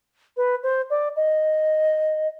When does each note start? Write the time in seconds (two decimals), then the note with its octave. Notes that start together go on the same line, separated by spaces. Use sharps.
0.37 B4
0.63 C5
0.90 D5
1.16 D#5